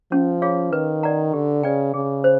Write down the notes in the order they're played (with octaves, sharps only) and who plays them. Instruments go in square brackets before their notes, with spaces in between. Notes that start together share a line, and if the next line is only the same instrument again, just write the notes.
[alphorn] F3 [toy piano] C#4
[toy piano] F4 G#4 C#5 F5
[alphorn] D#3 [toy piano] B4
[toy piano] D5 F#5 A#5
[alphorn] D3 [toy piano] G4
[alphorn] C#3 [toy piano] B4 D5 G5
[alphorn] C#3 [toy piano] G#4
[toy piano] C5